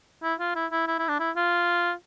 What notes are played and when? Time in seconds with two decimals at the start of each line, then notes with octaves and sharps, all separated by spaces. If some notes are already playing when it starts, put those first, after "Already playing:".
0.23 E4
0.39 F4
0.55 E4
0.71 E4
0.87 E4
0.99 E4
1.08 D4
1.20 E4
1.36 F4